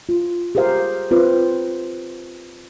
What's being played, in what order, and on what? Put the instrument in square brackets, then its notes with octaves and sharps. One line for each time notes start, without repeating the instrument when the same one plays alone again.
[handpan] F4
G4 G#4 A#4 C5 F5
C4 F4 B4 C5